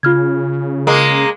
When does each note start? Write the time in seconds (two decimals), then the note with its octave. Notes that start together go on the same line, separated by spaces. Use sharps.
0.03 C#3 F4 F6 G#6
0.87 G#3 A#3